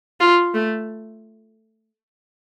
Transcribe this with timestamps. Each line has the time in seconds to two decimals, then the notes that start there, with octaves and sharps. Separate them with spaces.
0.20 F4
0.54 A3